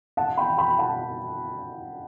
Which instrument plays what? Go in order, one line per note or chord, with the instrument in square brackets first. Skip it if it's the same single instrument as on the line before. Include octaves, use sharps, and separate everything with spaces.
[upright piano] F#5 A5
G5 B5
G5 B5
F#5 A5